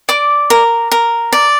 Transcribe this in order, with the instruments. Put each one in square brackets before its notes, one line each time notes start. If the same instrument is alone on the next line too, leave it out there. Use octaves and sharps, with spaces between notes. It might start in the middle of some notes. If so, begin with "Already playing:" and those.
[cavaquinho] D5 D6
A#4
A#4
D5